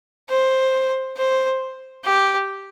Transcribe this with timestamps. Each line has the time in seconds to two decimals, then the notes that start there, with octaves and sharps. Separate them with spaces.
0.29 C5
1.17 C5
2.05 G4